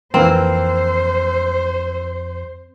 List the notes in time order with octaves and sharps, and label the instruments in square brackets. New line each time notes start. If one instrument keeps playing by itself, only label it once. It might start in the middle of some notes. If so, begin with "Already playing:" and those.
[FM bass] F2 [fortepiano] E3 A#3 [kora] C4 [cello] C5